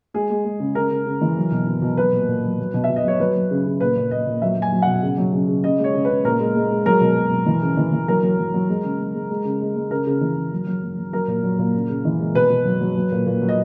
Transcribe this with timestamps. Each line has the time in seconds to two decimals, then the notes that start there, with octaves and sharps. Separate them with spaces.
0.14 G#3 G#4
0.30 G#3
0.45 G#3
0.60 C#3
0.75 C#3 A#4
0.91 C#3
1.06 C#3
1.21 E3
1.37 F#3
1.52 B2
1.67 B2
1.82 B2
1.97 F#3 B4
2.13 A#2
2.28 A#2
2.44 F#3
2.59 F#3
2.74 B2
2.84 E5
2.90 B2
2.96 D#5
3.04 F#3 C#5
3.20 F#3 B4
3.35 F#3
3.51 C#3
3.66 C#3
3.80 A#2 B4
3.96 A#2
4.11 A#2 D#5
4.27 A#2
4.42 F#3 E5
4.57 F#3
4.62 G#5
4.72 F#3
4.82 B2 F#5
5.03 C#3
5.18 F#3
5.33 C#3
5.48 C#3
5.64 C#3 D#5
5.79 G#3 C#5
5.94 C#3
6.05 C#3 B4
6.24 A#2 A#4
6.40 G#3
6.56 G#3
6.71 G#3
6.86 F#3 A#4
7.01 B2
7.17 F#3
7.31 B2
7.46 E3
7.62 C#3
7.77 E3
7.92 E3
8.08 F#3 A#4
8.23 F#3
8.38 F#3
8.54 F#3
8.69 G#3
8.84 C#3
8.99 G#3
9.14 G#3
9.30 G#3
9.45 C#3
9.61 G#3
9.76 G#3
9.91 C#3 A#4
10.07 C#3
10.21 E3
10.37 C#3
10.52 F#3
10.67 F#3
10.83 F#3
10.98 F#3
11.13 F#3 A#4
11.28 A#2
11.43 F#3
11.59 A#2
11.74 C#3
11.89 C#3
12.05 E3
12.20 G#3
12.35 B2 B4
12.50 B2
12.66 F#3
12.81 F#3
12.96 F#3
13.11 A#2
13.26 A#2
13.41 F#3
13.49 D#5